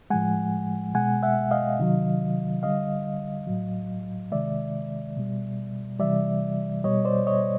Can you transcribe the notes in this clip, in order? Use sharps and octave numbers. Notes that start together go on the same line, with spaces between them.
A2 F3 G#3 F#5 G#5
B2 G#3 F#5 G#5
E5 F#5
D#5 F5
C3 D#3 F#3
D3 G3 D#5 F5
A2 F#3
C3 D#3 G#3 D5 E5
B2 G3
C3 E3 G3 D5 E5
B2 G3 C#5 D#5
C5 D5
C#5 D#5